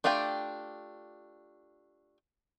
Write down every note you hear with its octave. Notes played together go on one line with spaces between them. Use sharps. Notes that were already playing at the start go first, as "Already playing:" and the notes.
A3 D4 F4 G4 G5